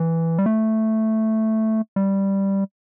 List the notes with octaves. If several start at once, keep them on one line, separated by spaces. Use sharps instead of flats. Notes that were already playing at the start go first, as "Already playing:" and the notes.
Already playing: E3
G3
A3
G3